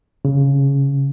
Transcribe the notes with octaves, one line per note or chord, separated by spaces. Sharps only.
C#3